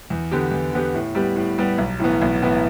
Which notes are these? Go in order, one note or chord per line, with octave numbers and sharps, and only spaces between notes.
E2
D3 B3 G4
E2
D3 B3 G4
A2
G3 B3 G4
A2
G3 B3 G4
B1
A2 E3 B3
B1
A2 E3 B3